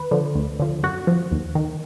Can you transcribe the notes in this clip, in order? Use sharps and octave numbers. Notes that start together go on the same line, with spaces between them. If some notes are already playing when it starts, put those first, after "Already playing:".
Already playing: D#2 B4
D3 F3
D2
D3 F3
F#2 F#4
F3
D#2
D#3